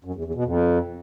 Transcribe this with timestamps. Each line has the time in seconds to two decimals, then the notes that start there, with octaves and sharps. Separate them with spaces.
0.04 F#2
0.14 E2
0.24 E2
0.34 B2
0.45 F2